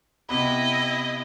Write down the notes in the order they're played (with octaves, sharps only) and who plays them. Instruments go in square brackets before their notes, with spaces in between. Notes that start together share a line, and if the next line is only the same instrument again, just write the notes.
[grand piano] C3 B3 B5 [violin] E4 D#5